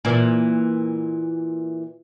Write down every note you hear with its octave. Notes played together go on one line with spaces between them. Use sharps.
A#2 E3